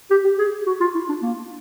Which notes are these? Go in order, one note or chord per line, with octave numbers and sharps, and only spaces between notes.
G4
G4
G#4
F#4
F4
E4
D4
A#3